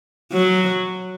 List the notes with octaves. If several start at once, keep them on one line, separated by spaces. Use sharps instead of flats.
F#3